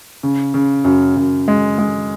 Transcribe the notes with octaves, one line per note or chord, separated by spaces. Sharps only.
C#3
C#3
F#2
F#2
G#3
G#3